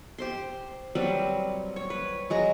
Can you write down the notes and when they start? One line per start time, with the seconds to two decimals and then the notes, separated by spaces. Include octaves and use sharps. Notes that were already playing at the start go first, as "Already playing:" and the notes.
0.18 G4 C5 C6
0.95 F#3 G3 C4 B4
1.76 C#5
1.90 B4
2.30 F#3 G#3 A#5